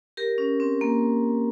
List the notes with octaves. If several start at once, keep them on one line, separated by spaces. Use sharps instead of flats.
G4 A#4
C#4
C4
A#3